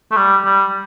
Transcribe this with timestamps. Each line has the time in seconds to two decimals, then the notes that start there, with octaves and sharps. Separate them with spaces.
0.11 A3
0.17 G3
0.45 G3